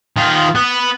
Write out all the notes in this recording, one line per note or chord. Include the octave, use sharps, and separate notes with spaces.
D#3 F4
B3